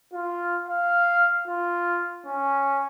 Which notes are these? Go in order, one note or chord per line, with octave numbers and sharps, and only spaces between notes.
F4
F5
F4
C#4